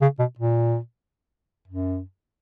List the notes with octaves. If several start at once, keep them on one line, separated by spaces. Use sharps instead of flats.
C#3
B2
A#2
F#2